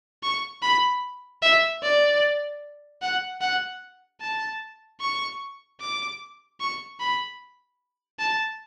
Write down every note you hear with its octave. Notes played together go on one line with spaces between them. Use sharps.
C#6
B5
E5
D5
F#5
F#5
A5
C#6
D6
C#6
B5
A5